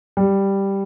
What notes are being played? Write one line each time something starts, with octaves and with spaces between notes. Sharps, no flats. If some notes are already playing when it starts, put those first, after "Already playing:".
G3